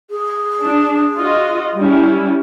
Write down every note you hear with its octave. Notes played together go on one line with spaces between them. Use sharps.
G#4
D4
F4 F#4 D#5
G3 C#4 E4